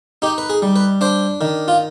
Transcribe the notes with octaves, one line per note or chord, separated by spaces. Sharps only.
D#4 G4
B4
G#4
G3
B4
D4 C5
D#3
F4